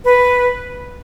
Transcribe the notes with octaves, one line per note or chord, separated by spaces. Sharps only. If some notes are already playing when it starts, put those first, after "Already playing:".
B4